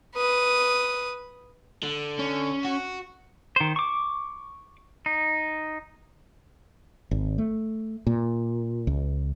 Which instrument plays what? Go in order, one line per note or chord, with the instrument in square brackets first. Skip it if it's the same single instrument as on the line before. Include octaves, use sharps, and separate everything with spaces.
[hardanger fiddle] B4 D#6
[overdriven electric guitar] D3
[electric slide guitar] C#4
[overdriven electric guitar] F#4
[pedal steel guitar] D#3 C5
C#6 D6
D#4
[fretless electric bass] G#1
A3
A#2
C#2